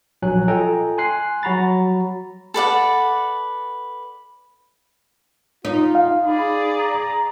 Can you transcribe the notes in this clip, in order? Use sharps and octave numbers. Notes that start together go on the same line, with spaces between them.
A#1 F#3 G#5 F#6
F4 A4 D#5 G5 G#5 A#5
G#5 C6 F#6 C7
F#3 F#4 A#5 B5 A6
A4 B4 D5 F#5
D#4 F4
F5
G#4 D5 B5
A#5